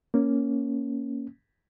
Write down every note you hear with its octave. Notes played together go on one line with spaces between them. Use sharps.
A#3 C#4